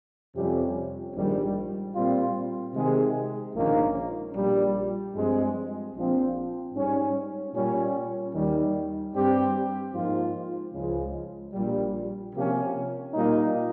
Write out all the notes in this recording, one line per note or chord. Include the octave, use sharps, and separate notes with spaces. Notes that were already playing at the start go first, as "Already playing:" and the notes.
F2 C3 G3 C#4 G4
A#1 G#2 D#3 G3
A#2 G3 C4 F4
C3 D#3 G#3
A#1 G#2 D#3 A#3 C#4
A#1 A#2 G3
G2 F3 G#3 C4
A#1 A#2 F3 C4
G#2 G3 C#4
A#2 G3 C#4
D#2 D#3 G3
G2 G3 C4 G4
G#2 F3 A#3 F4
C#2 C#3 F3 G#3
A#1 A#2 G3
C3 F3 A#3 C#4 G4
A#2 G3 A#3 D#4